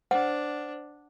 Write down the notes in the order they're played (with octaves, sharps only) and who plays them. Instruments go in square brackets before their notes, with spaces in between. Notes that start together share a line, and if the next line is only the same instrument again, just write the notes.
[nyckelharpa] D4 [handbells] C5 [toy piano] F#5